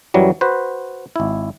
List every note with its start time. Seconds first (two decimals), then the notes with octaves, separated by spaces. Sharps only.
0.14 F#2 E3 F#3 G3
0.41 F#4 B4 C5
1.16 G#1 E4